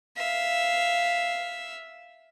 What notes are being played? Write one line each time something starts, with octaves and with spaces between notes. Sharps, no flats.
E5 F5